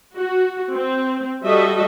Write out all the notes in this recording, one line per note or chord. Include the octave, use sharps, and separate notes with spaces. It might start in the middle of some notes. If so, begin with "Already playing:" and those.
F#4
C4
G3 F#4 A4 D#5 E5